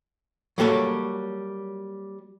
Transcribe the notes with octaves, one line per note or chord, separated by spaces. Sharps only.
F#3 G3 A#3 A4 C#5